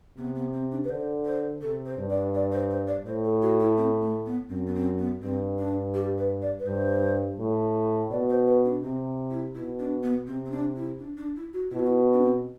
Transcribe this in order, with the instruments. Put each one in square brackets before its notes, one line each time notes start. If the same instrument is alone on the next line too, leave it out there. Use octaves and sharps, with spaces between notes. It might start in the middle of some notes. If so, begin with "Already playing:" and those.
[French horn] C3 [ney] B3
[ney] B3
C4
D4
B4
[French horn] D3 [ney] C5
[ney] C5
[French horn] C3 [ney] A4
[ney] C5
[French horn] G2
[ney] D5
D5
C5
C5
D5
[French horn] A2 [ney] C5
[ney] A4
F#4
E4
C4
A3
B3
[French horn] F#2 [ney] C4
[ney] B3
C4
B3
[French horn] G2 [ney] C4
[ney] D4
G4
B4
D5
B4
[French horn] G2 [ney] C5
[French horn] A2
[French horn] B2 [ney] D5
[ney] C5
B4
D4
[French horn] C3 [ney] C4
[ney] E4
[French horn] B2 [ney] E4
[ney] D4
B3
[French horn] C3 [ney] C4
[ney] C4
D4
E4
D4
D4
E4
F#4
[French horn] B2 [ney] E4
[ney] F#4
E4
D4
C4